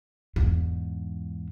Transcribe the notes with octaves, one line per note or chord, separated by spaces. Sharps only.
E2 G#2